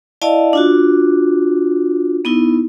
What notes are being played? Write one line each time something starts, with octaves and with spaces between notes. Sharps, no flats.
E4 D5 D#5 F5 A5
D4 F4 F#4
B3 D#4 E4